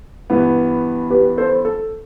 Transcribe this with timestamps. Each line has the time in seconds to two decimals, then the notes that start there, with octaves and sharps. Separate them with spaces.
0.30 G2 E3 B3
1.10 G4 B4
1.38 A4 C5
1.65 A4